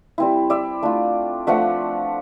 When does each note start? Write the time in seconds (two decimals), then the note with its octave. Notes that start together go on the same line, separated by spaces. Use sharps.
0.18 G3 C4 E4
0.50 D5 E5
0.82 A3 D4 F4
1.47 F3 A3 D4 E5 F#5